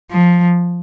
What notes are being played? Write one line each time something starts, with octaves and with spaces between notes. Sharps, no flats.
F3